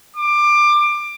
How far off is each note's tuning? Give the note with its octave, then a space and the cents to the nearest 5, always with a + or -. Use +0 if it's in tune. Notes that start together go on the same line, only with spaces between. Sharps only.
D6 +20